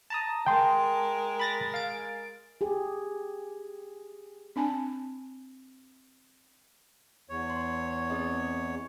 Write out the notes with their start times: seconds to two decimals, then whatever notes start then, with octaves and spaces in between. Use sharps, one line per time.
0.10 A5 A#5 D#6
0.46 G#3 A#4 G5 C6
1.39 B5 A6 A#6
1.74 F5 A6 D7
2.61 G4 G#4
4.56 C4 D4 G#5 A5
7.29 E2 C#5
7.50 C6
8.10 C4 G#4 D#5